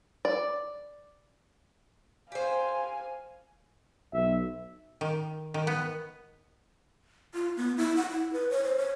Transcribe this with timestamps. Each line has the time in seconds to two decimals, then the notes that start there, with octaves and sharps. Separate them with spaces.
0.25 D5
2.32 G4 C5 F5 G#5
4.13 B1 E5
5.01 D#3
5.54 D#3
5.67 B3
7.34 F4
7.57 B3
7.77 E4
7.97 F#5
8.11 E4
8.33 B4
8.50 C#5
8.64 C5
8.77 C#5